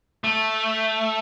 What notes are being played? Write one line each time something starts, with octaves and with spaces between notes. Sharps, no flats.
A3